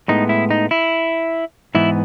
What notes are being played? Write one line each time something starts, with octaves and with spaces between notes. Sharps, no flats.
A2 G#3 B3 D#4
E4
D#4
E4
G#2 E3 B3 E4